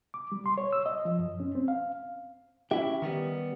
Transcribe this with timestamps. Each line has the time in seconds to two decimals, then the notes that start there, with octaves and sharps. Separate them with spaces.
0.14 D6
0.32 G3
0.46 C6
0.58 C#5
0.73 E6
0.86 D#5
1.05 F3
1.19 F#2
1.40 C#4
1.55 C4
1.68 F5
2.71 C#4 E4 G4 E5
3.02 D#3 G3 B3